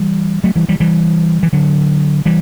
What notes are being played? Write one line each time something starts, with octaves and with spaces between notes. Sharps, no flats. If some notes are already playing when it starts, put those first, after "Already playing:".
Already playing: E3 G3
F#3 A3
E3 G3
E3 G3
E3 G3
E3
D3 F#3
E3 G3